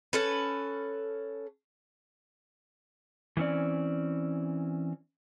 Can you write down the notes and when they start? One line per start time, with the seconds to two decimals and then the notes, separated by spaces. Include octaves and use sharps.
0.13 C#4 A4 B4
3.37 E3 G#3 C4 C#4 D5